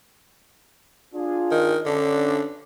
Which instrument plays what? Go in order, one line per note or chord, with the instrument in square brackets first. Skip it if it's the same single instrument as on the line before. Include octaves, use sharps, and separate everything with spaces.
[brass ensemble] D4 F4 G#4
[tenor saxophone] D#3
[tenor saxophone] D3 [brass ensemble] C#4 D4